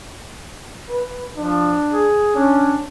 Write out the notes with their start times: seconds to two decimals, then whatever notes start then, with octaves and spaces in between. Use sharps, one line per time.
0.89 B4
1.37 F3 D4
1.92 G#4
2.36 C#4 D4